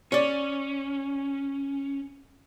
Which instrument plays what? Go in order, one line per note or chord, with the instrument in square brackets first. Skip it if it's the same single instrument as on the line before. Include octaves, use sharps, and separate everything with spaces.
[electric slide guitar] C#4 [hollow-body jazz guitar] C#5 D5